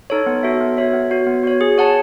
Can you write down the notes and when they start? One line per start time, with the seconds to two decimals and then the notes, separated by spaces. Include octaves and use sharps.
0.10 D#4 A4 C#5
0.26 B3
0.43 F#4 A4 C#5 E5
0.61 B3
0.77 F#4 A4 C#5 E5
0.94 B3
1.11 F#4 C#5
1.26 B3
1.44 F#4 C#5
1.61 G#4
1.78 C#5 F#5 A5